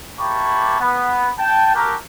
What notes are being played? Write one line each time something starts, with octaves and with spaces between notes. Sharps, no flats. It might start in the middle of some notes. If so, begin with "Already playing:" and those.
A#3 E4 G4 A5 B5 C#6
B3
G5 A5
F#4 G4 A4 A#4